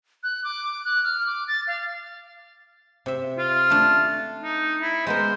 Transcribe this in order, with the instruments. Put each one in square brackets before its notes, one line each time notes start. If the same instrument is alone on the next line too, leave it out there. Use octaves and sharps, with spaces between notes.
[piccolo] F#6
D6
F#6
F6
D6
A6
F5
[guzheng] C3 E5
[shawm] F4
[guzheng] A3 D4
[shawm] D#4
E4
[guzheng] G#3 B3 A#4 [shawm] C5